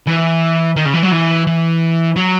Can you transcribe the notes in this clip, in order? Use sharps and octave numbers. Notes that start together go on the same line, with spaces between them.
E3
D#3
C#3
E3
F#3
E3
E3
F#3